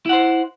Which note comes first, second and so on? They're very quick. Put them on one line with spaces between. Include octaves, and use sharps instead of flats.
E4 F#5 C5